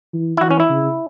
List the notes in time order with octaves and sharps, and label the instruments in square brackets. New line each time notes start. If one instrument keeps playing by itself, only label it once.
[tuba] E3
[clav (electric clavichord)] E4
[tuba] E3 [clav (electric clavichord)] F#4
[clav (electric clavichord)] C#4
E4
[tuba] C#3